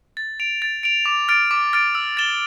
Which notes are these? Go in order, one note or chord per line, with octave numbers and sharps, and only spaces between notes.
A6
D7 F7
A6
D7 F7
D6
F6 A6 D7
D6
F6 A6 D7
E6
A6 E7 G7